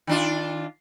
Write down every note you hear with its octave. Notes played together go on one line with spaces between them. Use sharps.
D#3 D4 F4